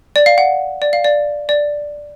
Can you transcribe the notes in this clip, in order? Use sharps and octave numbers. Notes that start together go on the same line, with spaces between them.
D5
F5
F#5
D5
F5
D5
D5